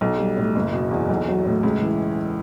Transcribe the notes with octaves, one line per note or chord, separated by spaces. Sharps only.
B1
G3
A2
F#1
B2
E2
B1
F#3
A2
C#2
E3